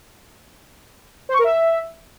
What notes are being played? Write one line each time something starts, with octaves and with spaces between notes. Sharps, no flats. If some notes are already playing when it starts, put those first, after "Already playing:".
C5
C#6
A#4
E5